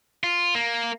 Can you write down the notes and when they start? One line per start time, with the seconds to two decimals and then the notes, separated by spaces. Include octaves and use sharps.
0.24 F4
0.55 A#3